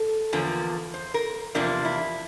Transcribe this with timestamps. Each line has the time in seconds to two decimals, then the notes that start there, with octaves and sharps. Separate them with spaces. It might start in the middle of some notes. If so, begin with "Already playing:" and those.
Already playing: A4
0.33 E2 D3 F3 A#3
0.94 C5
1.14 A#4
1.55 E2 C3 F3 A#3 D4
1.85 E4